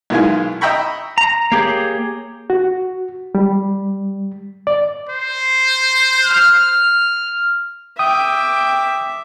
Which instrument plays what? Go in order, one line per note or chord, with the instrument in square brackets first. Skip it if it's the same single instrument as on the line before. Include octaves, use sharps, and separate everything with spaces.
[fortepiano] B1 D#3 E3 G#3 F4 G#5
D#5 E5 G5 A#5 B5 C#6
[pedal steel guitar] A#5
A#3 G4 G#4 C#5
[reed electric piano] F#4
G3
D5
[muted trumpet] C5
[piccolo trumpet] F6
[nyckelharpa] E5 D6 [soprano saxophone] G5 [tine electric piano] D#6